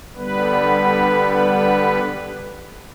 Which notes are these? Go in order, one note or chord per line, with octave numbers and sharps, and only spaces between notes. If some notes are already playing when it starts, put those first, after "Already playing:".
D3 G3 B3 B4